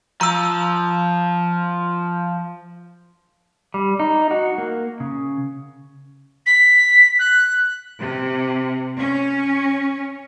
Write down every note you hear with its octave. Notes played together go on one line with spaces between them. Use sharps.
F3 A#5 E6
G3
D#4
F#4
A#3
C#3
B6
F#6
C3
C#4